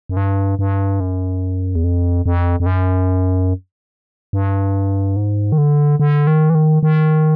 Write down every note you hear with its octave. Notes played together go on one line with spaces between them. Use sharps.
F#2
G2
G2
F#2
E2
F2
F2
F2
F#2
G2
G#2
D#3
D3
D3
D#3
E3
D#3
D#3